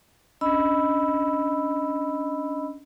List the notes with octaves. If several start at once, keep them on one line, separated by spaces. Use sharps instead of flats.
C#4 D4 D#5 B5 E6